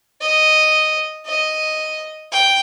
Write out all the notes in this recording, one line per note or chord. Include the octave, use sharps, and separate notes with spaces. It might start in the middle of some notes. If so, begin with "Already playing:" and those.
D#5
D#5
G5